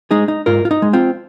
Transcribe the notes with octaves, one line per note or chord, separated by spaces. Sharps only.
G#3 D#4 G#4
D#4
G#2 F4 A#4
F4
D#4
G#3
C4 F4